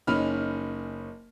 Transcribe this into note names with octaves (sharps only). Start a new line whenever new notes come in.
F#1 C#4 D#4 B5 F6